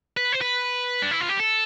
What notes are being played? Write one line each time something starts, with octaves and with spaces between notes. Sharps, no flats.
B4
C5
B4
D4
E4
F4
G4
A4